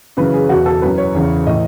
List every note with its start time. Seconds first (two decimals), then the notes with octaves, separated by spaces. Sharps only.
0.17 F#2 C#3 E3 B4
0.34 G#4
0.49 E2 B2 F#4
0.66 A4
0.81 F#2 E3 B4
0.98 C#5
1.14 E2 C#3 E3
1.46 A2 E3 D#5